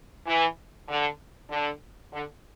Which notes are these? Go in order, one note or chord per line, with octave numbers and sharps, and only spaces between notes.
E3
D3
D3
D3